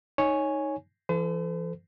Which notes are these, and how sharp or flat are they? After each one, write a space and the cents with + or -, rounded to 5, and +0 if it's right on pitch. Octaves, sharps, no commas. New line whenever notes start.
D#4 +0 C#5 +0 G#5 +0
E3 +40 A4 +0 C5 -45